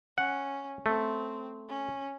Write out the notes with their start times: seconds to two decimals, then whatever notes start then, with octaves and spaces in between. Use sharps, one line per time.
0.18 C#4 F#5
0.86 A3 C4
1.69 C#4